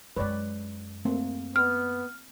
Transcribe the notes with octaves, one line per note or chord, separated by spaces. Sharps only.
F#2 G#3 B4 C#5 D5
A3 A#3 C4
B3 F6